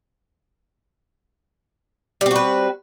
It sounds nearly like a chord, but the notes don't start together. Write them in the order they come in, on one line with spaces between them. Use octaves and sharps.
G3 C4 F#4 B4